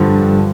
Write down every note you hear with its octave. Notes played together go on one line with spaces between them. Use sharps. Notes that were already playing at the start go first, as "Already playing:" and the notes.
Already playing: G2 D3 F3